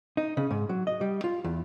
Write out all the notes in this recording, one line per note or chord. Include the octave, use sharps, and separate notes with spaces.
D#4
C#3
G#2
F#3
D#5
G3
F4
E2